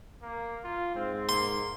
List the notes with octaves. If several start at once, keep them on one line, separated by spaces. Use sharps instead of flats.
A#3
F4
G#2 C4
A#3 C6